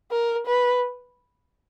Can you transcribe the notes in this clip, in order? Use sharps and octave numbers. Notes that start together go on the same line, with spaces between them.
A#4
B4